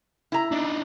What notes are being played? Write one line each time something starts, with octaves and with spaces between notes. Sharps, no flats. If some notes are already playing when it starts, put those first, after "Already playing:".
E4 A#5
D4 D#4